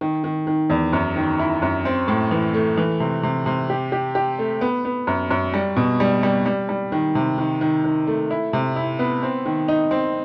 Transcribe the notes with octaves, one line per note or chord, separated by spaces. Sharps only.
D#3
D#3
D#3
E2
F#2
D#3
E4
F#2
C4
A2
E3
A3
E3
C3
C3
C3
G4
G4
G4
A3
B3
B3
F#2
F#2
G3
B2
G3
G3
G3
G3
D#3
C3
D#3
D#3
D#3
A3
E4
C3
E4
B3
C4
D#3
D#4
C4